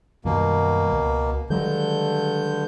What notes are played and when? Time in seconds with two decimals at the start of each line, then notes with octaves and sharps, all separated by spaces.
0.25 F#2 B2 D#3 G3 A#3
0.93 C#2
1.50 G2 D3 D#3 F#3 G#3 G6